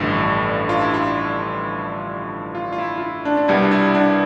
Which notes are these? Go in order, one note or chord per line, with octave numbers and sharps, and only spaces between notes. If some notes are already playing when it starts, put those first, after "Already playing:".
Already playing: A1 G2 D3 F3 E4
F4
E4
F4
F4
F4
E4
F4
E4
D4
D4
C2 B2 G3 E4
D4
E4
D4